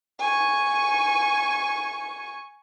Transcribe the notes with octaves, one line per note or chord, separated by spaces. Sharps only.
G#5 C#6